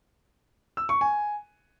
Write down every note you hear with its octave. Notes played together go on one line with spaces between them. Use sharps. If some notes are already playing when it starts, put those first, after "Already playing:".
E6
C#6
G#5